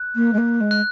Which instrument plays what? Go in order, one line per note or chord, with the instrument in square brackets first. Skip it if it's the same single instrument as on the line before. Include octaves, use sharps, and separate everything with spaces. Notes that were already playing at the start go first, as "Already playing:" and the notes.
Already playing: [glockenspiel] F#6
[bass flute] A#3
G#3
A#3
G#3
[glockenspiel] F#6